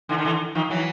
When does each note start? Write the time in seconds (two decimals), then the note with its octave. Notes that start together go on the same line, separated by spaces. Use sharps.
0.09 D3 E3
0.18 D#3
0.25 D3 E3
0.55 D#3 F3
0.70 E3 F#3